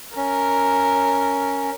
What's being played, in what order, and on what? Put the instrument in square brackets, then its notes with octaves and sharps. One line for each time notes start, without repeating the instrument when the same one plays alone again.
[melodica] C#4 [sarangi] A#4